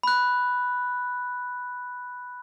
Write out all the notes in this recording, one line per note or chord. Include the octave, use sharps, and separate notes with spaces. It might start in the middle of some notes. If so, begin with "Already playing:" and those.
B5 F#6